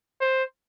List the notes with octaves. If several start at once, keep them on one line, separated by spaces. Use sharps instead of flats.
C5